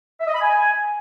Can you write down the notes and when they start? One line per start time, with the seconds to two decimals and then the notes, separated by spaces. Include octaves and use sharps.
0.21 E5
0.28 D#5
0.35 B5
0.41 G#5